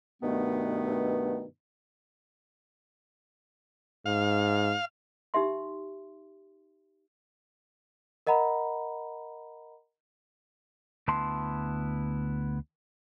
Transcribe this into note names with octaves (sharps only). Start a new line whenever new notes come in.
G2 B2 D#3 A3 B3
G#2 F5
D#4 G4 E5 C6
A#4 D#5 F#5 A#5 B5
D2 B3 E4 A5 C6